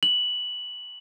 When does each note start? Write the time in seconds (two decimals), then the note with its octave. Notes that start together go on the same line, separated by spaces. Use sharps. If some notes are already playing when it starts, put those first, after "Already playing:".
0.03 F#7